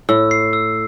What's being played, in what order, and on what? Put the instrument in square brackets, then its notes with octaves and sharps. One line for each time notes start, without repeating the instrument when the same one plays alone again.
[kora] A2 [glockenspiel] E6
[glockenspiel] C7
E6